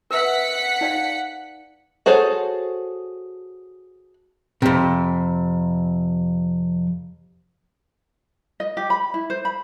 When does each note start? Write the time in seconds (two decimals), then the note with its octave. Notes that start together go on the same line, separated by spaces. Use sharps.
0.11 A#4 B4 E5 F#5 B6 C#7
0.81 D#4 D5 F5
2.06 F#4 G#4 A4 C5 C#5
4.62 F2 C3
8.60 D#5
8.77 G4
8.90 B5
9.14 E4
9.30 C5
9.45 B5